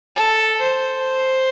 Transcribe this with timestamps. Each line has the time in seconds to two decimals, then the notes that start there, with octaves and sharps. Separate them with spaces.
0.16 A4
0.61 C5